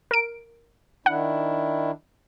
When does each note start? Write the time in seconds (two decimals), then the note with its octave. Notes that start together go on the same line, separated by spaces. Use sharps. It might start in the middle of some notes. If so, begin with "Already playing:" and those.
0.11 A#4 D7
1.06 D#3 D4 E4 F#5